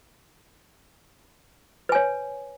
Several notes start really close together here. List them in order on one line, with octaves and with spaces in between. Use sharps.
B4 G#5 C#5